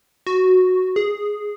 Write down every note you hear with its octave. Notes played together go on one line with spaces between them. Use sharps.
F#4
G#4